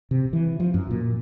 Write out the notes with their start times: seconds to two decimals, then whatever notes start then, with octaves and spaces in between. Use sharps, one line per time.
0.11 C3
0.33 E3
0.60 F3
0.74 F#2
0.91 A#2